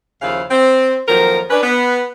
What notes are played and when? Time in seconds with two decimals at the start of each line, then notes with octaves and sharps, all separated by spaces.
0.22 D#2 C#3 F3 E4 F5
0.51 C4
1.08 F2 D#3 F3 F#3 A#3 A#4
1.50 C#4 D4 B4
1.63 B3